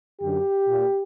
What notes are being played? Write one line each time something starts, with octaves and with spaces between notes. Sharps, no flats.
F#2 D3 G4
A#2